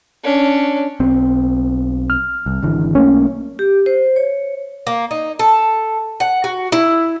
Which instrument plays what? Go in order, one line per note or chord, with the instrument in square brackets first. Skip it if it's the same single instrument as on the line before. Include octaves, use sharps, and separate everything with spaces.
[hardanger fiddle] C#4 D4
[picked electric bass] B1 C4
[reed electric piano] F6
[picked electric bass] C2
G#1 D3 E3
[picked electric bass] B1 A3 A#3 [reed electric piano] C#4
[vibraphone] G4
C5
C#5
[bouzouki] A#3
D#4
A4
F#5
F#4
E4